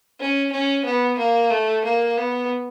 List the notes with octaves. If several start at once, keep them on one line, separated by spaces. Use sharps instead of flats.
C#4
C#4
B3
A#3
A3
A#3
B3